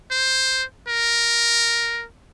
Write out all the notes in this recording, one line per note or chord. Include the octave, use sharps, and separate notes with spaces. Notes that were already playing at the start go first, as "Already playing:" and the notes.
C5
A#4